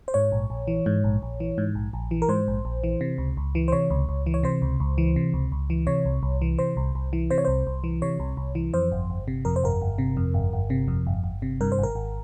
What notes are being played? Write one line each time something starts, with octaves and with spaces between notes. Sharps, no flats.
C5
G#2 C#5
A#1
A#1
E3
G#2
A#1
A#1
E3
G#2
A#1
A#1
E3
A#4
G#2 C5
A#1
A#1
E3
C3
C#2
C#2
E3
C5
C3 C#5
C#2
C#2
E3
C#5
C3 C5
C#2
C#2
E3
C3
C#2
C#2
E3
C3 C#5
C2
C2
E3
C3 C5
C2
C2
E3
C3 C5
C#5
C2 C5
C2
E3
C3 C#5
C2
C2
E3
F2 C5
G1
G1
C3
F2 A#4
C5
G1 A#4
G1
C3
F2
G1
G1
C3
F2
G1
G1
C3
G2 A#4
C5
G#1
A#4
G#1